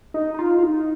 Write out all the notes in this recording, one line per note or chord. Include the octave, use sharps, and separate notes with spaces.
D#4
D#4
F4
F4
D#4